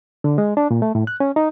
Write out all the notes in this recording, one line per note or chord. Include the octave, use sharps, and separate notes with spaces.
D3
G#3
D4
A#2
A3
A2
F#6
C#4
D#4